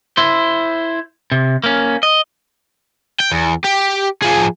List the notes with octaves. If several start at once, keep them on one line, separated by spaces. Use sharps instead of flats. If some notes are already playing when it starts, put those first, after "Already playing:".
E4 C5
C3
A#3 C#4
D#5
G5
E2
G4
F3 G#4